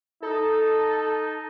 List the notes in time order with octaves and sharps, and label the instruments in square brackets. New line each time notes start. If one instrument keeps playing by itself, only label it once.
[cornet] D#4 [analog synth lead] A4